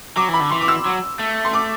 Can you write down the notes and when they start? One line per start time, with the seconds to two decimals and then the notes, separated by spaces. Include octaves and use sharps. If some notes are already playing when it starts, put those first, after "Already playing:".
0.16 F#3 D6
0.29 E3 B5
0.40 D3
0.51 E3 C6
0.61 D6
0.68 E6
0.85 F#3
1.19 A3
1.45 C6
1.53 D6